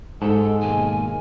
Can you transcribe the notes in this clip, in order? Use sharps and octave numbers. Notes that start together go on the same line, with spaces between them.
G#2 G#3 G4 A4 F#5 A5
D#2 B2 A#3 G#5